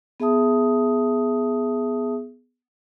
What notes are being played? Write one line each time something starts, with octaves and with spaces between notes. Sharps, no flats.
B3 G#4 E5 A5 D#6